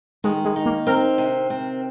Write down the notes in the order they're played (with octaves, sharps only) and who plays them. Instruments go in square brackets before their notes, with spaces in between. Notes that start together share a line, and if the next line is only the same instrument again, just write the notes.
[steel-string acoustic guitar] D#3 [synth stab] G#3
[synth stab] G#3
[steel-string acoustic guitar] D#4
[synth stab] A#3
[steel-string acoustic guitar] C4 [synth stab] A#4
[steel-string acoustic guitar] C3
C4